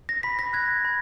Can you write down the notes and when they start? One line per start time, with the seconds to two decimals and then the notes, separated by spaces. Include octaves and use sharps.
0.09 A#6
0.23 B5 B6
0.39 A#6
0.53 F#6 G#6
0.85 B5